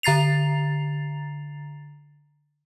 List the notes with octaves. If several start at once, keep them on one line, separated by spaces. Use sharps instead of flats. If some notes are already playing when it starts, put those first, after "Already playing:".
D3 A#5 A6 C7 F7